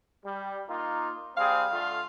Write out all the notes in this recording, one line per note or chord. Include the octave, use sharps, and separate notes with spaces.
G3
A#3 D#4 F4
G3 C4 G#4 F5
D3 A3 F4